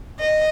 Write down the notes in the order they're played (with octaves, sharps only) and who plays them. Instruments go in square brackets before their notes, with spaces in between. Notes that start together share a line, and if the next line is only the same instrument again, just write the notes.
[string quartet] D#5